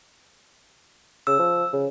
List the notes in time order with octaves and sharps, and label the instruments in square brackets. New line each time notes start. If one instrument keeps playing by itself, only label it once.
[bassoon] C#3 [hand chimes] E6
[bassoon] F3
C#3